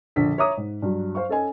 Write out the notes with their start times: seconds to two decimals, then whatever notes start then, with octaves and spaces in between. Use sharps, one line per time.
0.16 A#1 D3 B6
0.38 C#5 E5 A#5 D6 D#6
0.57 G#2
0.82 G2 F#3
1.15 C5 F5 C#6
1.29 C#4 A4 D#5 G#5